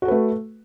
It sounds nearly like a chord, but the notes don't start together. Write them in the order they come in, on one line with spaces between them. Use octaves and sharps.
F#4 A4 B4 A3